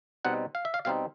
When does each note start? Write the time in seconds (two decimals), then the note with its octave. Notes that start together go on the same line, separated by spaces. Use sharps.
0.25 B2 G3 C4 D#4 F#5
0.55 F5
0.65 E5
0.74 F5
0.85 B2 G3 C4 D#4 F5